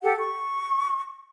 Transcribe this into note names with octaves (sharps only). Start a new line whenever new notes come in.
G4 A4 F#5
C#6